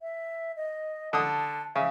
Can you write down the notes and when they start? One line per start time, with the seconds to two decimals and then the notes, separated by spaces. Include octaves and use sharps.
0.01 E5
0.56 D#5
1.13 D3 A5 D#6
1.76 C#3 E5